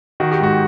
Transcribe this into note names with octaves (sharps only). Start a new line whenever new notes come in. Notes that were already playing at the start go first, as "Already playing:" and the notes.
D#3 F#4
G4
G#2 F#4